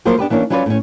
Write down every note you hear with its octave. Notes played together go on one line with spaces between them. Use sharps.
F3 F#3 A#3 A#4 C5
B3 D4 G4 B4
E3 A#3 C#4 D4
F#3 C#4 E4 F4 B4 D5
A2 C#4